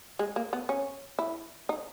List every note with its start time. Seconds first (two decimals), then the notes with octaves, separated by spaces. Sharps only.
0.19 G#3
0.36 A#3
0.53 B3
0.69 C#4
1.19 E4
1.69 D#4